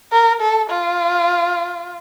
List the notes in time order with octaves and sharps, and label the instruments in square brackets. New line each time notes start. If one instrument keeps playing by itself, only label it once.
[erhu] A#4
A4
F4